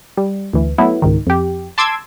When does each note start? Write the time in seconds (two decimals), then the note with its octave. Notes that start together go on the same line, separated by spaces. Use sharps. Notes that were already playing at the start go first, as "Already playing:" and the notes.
0.17 G3
0.53 D2 E3
0.78 F#3 A3 B3 E4
1.02 C#2 G#2 D#3
1.27 F2 G4
1.78 A5 C6 D6 E6 G#6